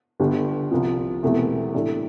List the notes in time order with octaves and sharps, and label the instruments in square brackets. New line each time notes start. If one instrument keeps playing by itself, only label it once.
[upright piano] G1 G2 D3 G3
C2 C3 F3
E1 E2 C3 E3 A3
A2 G3 D4 A4